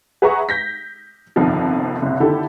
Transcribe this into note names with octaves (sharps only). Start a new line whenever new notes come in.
G#4 B4 E5 F#5 A#5 C#6
G6 A#6 B6
G1 C2 F2 D#3 F3
F#1 C2
D3 D#3 E4 G4 A4